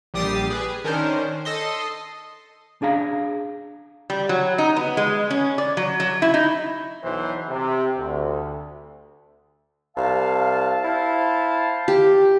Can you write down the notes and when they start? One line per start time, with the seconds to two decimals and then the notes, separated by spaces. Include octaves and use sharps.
0.14 A#1 G3 G4 D#6 A6 C7
0.50 G#4 B4
0.84 D#3 C#4 D4 A#4 C5
1.45 A4 D#5 C6
2.82 D4 G#4 F5 A#5
4.10 G3
4.29 F#3
4.58 D#4
4.76 B3
4.97 G#3
5.30 C#4
5.58 D5
5.77 F#3
6.00 F#3
6.22 E4
6.34 D#4
7.04 B1 E3 C5
7.49 C3
7.98 D2
9.97 C2 F5 A5
10.84 E4 C5 F5 A5
11.88 G4